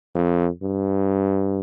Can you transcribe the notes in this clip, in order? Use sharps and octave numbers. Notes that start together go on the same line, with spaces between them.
F2
G2